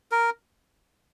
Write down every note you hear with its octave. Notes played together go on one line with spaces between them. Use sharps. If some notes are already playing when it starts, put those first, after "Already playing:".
A#4